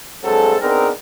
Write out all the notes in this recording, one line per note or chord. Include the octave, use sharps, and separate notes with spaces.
G2 F#3 G#3 C4 G#4 A4
B3 C4 D4 D#4 G#4 A#4